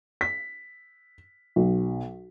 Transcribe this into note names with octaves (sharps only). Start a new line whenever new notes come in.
B6
B1